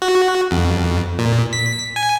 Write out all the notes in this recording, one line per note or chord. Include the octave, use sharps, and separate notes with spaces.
F#4
F2
A#2
B6
G#5